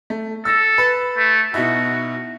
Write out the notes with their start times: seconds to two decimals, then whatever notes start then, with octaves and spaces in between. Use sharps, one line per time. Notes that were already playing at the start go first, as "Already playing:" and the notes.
0.10 A3
0.45 A4 E6 A#6
0.78 B4
1.18 A3
1.54 B2 D#4 E4 F#4